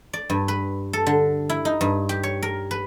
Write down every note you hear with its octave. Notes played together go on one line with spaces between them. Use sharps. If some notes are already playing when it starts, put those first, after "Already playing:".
D5
G2
B4
A4
D3
E4
D#4
G2
G4
C#5
A#4
B4